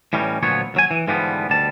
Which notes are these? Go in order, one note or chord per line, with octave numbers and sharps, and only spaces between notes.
A2 E3 G3 C#4 D#4
D2 A#2 F3 F#3 B3 C#5
D#2 F#3 G#5
E3
G#2 D3 E3 F3 G3 B3
D2 B2 G3 A5